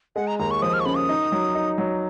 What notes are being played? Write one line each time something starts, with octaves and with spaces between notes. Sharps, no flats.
G#3 F#5
A#5
D#2 A#5
C#6
F3 D#6
F6
C#6
C#3 B5
D#6
D#4
F#3
D#4
F#3